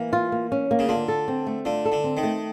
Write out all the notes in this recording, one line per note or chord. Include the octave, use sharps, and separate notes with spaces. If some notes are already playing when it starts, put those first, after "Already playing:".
Already playing: E3 A#3
F4
A#3
C#4
A#3
C#3
D3 F4
A4
C4
A3
D3 F4
A4
D3
C4
D#3
A3